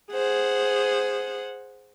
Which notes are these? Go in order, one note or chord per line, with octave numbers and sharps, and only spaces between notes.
G#4 C5 F#5